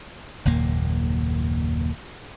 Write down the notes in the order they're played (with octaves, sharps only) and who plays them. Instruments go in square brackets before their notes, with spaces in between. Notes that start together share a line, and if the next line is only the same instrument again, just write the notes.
[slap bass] F#1 D#2 A#2 A#3